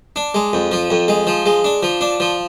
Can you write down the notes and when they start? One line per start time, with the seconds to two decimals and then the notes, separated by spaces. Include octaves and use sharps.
0.16 D4
0.34 G#3
0.53 F2
0.72 F3
0.90 F2
1.08 G#3
1.27 F3
1.46 G#3
1.64 D4
1.83 F3
2.01 D4
2.20 F3